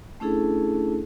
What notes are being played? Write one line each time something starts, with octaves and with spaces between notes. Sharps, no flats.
A3 C#4 D4 E4 G#4 A4